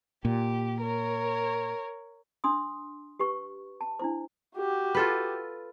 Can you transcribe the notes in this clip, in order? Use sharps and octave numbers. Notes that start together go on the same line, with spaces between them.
A#2 G4
A#4 C#5
D4 C6 D#6
G4 B4 C#6
A5
D4 E4 C5
F#4 G4
F4 A4 B4